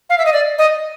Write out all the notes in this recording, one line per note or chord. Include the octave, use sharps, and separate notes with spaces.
F5
E5
D#5
D5
D#5